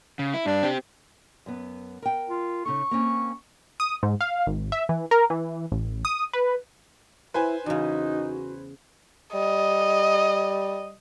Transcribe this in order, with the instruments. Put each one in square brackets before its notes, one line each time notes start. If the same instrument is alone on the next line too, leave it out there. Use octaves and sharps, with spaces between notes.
[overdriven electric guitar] C#3
E4
[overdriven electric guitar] G2 [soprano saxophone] D4
[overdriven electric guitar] C4 G4
[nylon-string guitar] F#2 B3
A#4 G5
[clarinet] F4
[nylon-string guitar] C#3 D#4 A4 [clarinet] C#6
[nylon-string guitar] A#3 C4 C#4
[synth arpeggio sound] D#6
G#2
F5
G#1
E5
E3
A#4
E3
A1
D#6
B4
[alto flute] E4 [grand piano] B4 C5 G#5
[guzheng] E2 C#3 [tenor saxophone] D#4 [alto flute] F#4
[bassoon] G3 [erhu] D#5